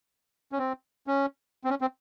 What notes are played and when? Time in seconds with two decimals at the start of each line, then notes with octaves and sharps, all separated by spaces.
0.52 C#4
0.58 C4
1.07 C#4
1.64 C4
1.70 C#4
1.81 C4